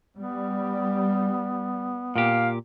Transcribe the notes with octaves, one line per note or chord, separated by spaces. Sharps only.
G3 B3
A#2 G4 F5